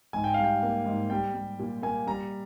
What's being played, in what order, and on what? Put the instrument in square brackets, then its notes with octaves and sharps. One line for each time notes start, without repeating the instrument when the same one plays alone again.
[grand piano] G#2 G#5
G5
G3 F5
G5
A#3
G#2
G3 G5
G3
A#2
A#3 G#5
G3 A#5